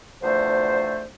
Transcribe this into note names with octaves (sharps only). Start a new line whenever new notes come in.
E2 D3 F3 A3 C5